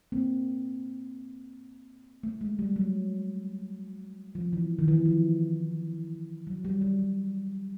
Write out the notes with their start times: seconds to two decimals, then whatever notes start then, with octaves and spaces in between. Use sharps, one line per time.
0.12 A#3 C4
2.23 A3
2.41 G#3
2.59 G3
2.76 F#3
4.35 F3
4.53 E3
4.79 D#3
4.88 E3
5.05 F3
6.47 F#3
6.65 G3
6.81 G3
6.99 F#3